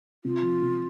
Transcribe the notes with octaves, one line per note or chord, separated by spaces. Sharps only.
C3 F4
F3
C3